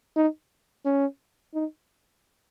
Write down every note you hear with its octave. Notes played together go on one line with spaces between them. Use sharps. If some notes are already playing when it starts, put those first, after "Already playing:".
D#4
C#4
D#4